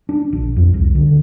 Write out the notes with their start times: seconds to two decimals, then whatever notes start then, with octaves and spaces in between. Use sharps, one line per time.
0.09 D4
0.33 A#1
0.56 F2
0.74 C2
0.95 D3